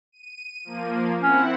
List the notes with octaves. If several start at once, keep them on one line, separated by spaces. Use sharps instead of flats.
D#7
F3 A#3
C4 C#4 E4 F#5